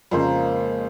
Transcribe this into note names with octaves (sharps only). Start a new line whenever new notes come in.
F2 A#2 C#3 G#3 C5